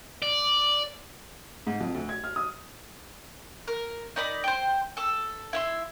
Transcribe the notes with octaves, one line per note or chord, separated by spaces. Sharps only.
D5
G#2
F2
D2
G#6
F6
D#6
A#4
D#4 A#4 D5 B5
C5 G5
A4 E6
E4 E5 C6